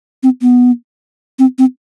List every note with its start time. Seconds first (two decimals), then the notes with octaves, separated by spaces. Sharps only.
0.23 C4
0.42 B3
1.39 C4
1.59 C4